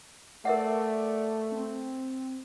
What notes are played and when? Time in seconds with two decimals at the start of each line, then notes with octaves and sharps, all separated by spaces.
0.45 A3 A#4 D5 E5 F#5
1.52 C4